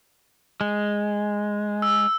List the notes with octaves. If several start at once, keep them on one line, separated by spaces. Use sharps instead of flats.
G#3
E6